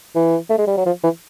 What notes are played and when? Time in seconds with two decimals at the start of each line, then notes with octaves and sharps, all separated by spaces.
0.15 E3
0.50 A3
0.58 G#3
0.67 G3
0.77 F#3
0.86 F3
1.04 E3